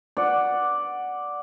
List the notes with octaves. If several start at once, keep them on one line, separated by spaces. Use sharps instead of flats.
D5 F#5